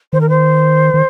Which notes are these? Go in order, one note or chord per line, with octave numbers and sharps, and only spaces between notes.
D#3 C5
A#4
C5
D#3